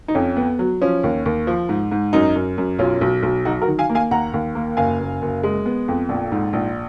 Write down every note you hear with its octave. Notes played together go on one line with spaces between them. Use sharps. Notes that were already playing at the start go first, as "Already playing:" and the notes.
D#4
F2 C#4
B3
F#3
F3 C#4
D#2
D#2
F3
G#2
G#2
F#2 D#4
F#2
F#2
B1 C#4 F4
B1
B1
F#3 D#4 F#4
F#4 A#4
D#3
F5 G#5
A#3
F5 G#5
D#2 F#5 A#5
D#2
A#3
F#1 F5 G#5
F#1
F#1
G#3
B3
F2
A#1
G#2
A#1